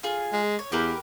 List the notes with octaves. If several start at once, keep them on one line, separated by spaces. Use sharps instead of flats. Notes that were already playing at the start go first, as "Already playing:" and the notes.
F4 G#4
G#3
C#5
E2 G4 A#4 B4